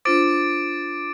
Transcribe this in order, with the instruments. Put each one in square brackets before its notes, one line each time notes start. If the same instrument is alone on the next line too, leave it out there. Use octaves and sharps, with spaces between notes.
[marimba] D4 F4 C5 [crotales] D6 A6 D7